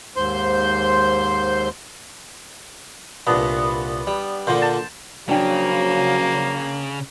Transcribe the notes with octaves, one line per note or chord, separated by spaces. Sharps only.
D#2 G#2 C5 C6 G6
C2 A#2 B3 D4
G3
A#2 D3 A#3 C5
A5
C#3 F3 F#3 A#3 D4 G5